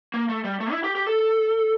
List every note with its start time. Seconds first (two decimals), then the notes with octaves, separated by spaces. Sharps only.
0.14 A#3
0.29 A3
0.44 G3
0.60 A3
0.72 E4
0.84 G4
0.95 G4
1.07 A4